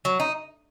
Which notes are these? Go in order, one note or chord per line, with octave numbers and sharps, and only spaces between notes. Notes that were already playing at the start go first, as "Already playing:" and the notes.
F#3
D#4